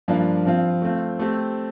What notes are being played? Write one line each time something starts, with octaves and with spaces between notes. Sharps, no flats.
G2 F3 A#3 D4 F4
F3 C4 F4
A3 C4 F4
A3 C4 G4